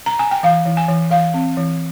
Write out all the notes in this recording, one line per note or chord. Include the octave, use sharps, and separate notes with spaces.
A#5
G#5
G5
E3 F5
E3
G#5
E3
E3 F5
C4
E3